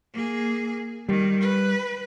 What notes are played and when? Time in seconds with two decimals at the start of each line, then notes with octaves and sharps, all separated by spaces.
0.14 A#3 G#4
1.09 D#3 G3
1.41 B4